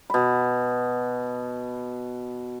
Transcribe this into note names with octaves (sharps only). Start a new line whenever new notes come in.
B2 B5